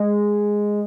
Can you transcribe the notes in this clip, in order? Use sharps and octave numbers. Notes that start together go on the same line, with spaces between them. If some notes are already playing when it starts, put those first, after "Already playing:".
Already playing: G#3